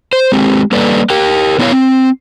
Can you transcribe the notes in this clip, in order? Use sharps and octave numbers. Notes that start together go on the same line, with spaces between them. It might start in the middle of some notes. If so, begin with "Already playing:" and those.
C5
G#3 C4 G4
G3 A#3 A4 B4 D5
G4 A#4 G5
B3 D4 E4 F4 C#5 F5
C4